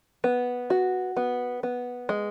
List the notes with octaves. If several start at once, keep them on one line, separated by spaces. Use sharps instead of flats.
B3
F#4
B3
B3
G#3